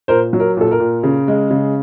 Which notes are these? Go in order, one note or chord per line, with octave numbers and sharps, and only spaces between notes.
A#2 A#4 C5
F#3
A#4
A#2 A4
A#4
A#2
C#3
G#3
C#3